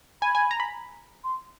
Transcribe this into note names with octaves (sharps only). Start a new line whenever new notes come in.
G#5 B5
G#5
A#5
B5
C6